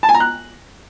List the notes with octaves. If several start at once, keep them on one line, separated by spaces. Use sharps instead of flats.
A5
G#5
A#5
F#6